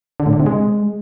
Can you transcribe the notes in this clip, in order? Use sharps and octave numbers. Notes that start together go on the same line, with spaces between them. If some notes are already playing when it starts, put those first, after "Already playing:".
D3
A2
D3
C3
G#3